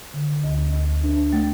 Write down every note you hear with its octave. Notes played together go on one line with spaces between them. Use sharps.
D3
D2
D2
D4
A3